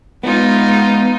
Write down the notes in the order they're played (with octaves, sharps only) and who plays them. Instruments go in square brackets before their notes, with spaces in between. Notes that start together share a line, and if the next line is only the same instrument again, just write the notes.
[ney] G#3 [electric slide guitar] B3 [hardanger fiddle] D#4 F4